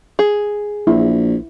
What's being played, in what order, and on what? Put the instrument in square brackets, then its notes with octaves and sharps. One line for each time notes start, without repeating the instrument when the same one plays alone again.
[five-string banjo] G#4
[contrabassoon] A#1 [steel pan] E4